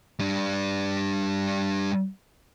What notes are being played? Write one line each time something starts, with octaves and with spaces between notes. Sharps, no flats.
G3 D4